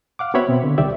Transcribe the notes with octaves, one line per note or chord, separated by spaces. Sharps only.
F5 F#5 D6
B3 C4 F#4 C#5 E5 B5
B2 C4
D3
C2 D#3 G4 D5 E5